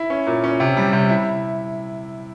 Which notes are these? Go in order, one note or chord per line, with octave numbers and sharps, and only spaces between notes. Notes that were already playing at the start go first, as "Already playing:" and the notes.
Already playing: E4
C#4
A#2
C#4
C3
G3
C3
E4